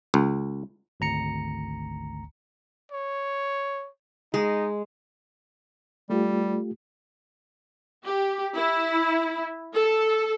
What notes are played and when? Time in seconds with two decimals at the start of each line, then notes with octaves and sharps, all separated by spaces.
0.14 C#2
1.00 G#1 D2 A#5 C#7
2.92 C#5
4.34 G#3 D#4
6.10 G3 A3 F4 G4
8.05 G4
8.55 E4
9.74 A4